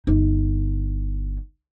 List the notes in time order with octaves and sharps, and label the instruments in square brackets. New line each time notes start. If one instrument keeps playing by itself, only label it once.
[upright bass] G1 D#4